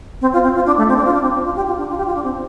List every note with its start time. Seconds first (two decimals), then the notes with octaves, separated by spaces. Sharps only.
0.21 C4
0.33 F4
0.44 C4
0.55 F4
0.66 D4
0.77 A3
0.89 C4
0.97 D4
1.06 F4
1.14 D4
1.22 C4
1.34 D4
1.45 F4
1.56 G4
1.67 F4
1.78 D4
1.89 F4
1.98 G4
2.06 F4
2.15 D4
2.24 C4